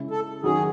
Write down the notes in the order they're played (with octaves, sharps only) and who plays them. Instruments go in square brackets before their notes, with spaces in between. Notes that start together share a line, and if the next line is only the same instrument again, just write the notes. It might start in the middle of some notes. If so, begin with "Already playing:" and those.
Already playing: [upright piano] C#3 G#3 C#4 E4
[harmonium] A4
[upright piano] D#3 F#3 C#4 F#4 [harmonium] G#4